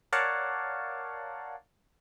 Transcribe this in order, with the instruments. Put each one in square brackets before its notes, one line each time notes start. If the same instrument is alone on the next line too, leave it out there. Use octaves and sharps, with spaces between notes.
[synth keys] A#4 C#5 D5 F5 F#5 A5